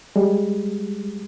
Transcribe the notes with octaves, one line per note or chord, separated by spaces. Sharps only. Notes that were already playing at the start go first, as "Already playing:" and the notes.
G3 G#3